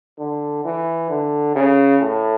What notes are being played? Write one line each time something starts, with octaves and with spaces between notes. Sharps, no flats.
D3
E3
D3
C#3
A2